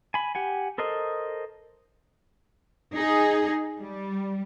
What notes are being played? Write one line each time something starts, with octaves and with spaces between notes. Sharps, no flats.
G#5 B5
G4 F#5 G#5
A4 A#4 C5 D#5
D#4 G#4
G3